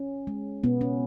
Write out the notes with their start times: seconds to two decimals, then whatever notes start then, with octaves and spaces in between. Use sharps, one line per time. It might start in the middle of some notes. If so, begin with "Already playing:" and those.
Already playing: C#4
0.27 G#3
0.64 B2 B3
0.81 C#4